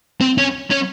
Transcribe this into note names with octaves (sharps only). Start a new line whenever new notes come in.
C4
C#4
C#4